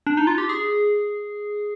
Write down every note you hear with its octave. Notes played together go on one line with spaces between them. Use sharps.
D4
D#4
F4
G4
G#4